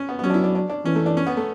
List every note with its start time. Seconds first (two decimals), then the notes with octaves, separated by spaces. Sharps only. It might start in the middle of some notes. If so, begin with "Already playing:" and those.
Already playing: C#4
0.09 B3
0.19 B3
0.23 F#3 C#4
0.30 D4
0.34 E4
0.44 D4
0.55 D4
0.70 D4
0.85 E3 C#4
0.95 A3
1.06 D4
1.17 C#4
1.27 B3
1.37 A3